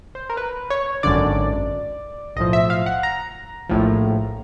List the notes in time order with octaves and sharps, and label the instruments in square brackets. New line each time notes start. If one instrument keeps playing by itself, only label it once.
[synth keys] C5
A#4
B4
C#5
G#1 F#2 D3 D5
B1 A2 F3 D#5
E5
F5
F#5
A#5
A#1 A2 F3